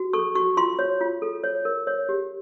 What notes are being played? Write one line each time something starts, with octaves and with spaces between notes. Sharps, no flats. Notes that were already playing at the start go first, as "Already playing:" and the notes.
Already playing: F#4
A4 C#6
F#4 C#6
F4 C6
C#5
F4
A4
C#5
A#4
C#5
G4